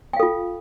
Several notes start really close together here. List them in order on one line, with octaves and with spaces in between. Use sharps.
G5 F5 A4 F4